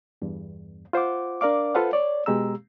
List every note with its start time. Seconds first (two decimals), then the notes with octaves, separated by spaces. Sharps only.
0.22 E2 G2
0.93 F4 C5 F#5 D6
1.41 D4 A#4 D5 F5 D6
1.75 F4 A4 B4 C5 F5 F#5
1.93 C#5 D5
2.26 B2 G#3 G4 A#5 E6